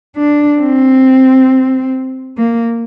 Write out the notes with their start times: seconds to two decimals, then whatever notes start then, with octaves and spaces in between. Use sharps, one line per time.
0.17 D4
0.61 C4
2.38 A#3